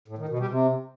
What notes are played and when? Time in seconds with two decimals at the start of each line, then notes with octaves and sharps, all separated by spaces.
0.08 A2
0.18 D#3
0.29 B2
0.39 G3
0.49 C3